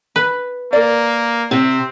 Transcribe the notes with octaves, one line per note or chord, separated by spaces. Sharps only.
B4
A#3 A#4 D5
C3 C4